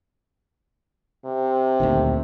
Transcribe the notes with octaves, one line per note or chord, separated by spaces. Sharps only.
C3
D2 A#2 D#3